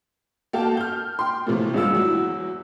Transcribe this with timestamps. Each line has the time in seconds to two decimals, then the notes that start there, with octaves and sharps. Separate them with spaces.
0.53 A#3 F#4 A4 F5 G5 A5
0.77 F6 G6
1.19 G5 C6
1.46 A2 C3 E3 F3 A3 A#3
1.74 G#1 G2 G#3 A#3 F4 E6
1.93 E2 F#3 E4